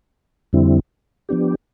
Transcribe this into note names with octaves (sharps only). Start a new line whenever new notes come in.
F2 D3 G3 C4 E4
F3 B3 D4 G4